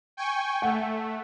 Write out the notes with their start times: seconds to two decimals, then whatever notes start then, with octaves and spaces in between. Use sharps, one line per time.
0.17 G5 G#5 C#6
0.62 A3 F#5